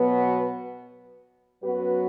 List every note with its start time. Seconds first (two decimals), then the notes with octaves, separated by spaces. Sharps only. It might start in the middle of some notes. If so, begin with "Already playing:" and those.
Already playing: B2 F#3 B3
1.64 F#2 F#3 B3 F#4 B4